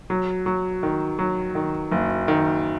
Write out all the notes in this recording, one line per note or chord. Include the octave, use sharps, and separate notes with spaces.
F#3
F#3
D#3
F#3
D#3
F#1
D#3